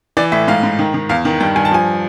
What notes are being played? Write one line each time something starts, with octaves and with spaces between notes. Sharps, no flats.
E3 D5
A2 E5
G#2 F5
G#2
D#3
D#3
E2 F5
D#3
G2 G5
G2 G#5
A5
F3 G#5